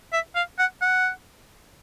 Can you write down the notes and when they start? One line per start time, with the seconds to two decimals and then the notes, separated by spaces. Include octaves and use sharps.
0.13 E5
0.35 F5
0.59 F#5
0.82 F#5